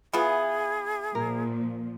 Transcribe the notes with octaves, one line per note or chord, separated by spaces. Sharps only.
E3 B3 F4 G#4 E5
A#2 F3 A#4